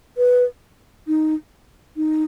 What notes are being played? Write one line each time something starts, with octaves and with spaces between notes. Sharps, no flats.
B4
D#4
D#4